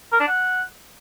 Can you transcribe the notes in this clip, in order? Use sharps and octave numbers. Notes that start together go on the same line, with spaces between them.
A#4
D4
F#5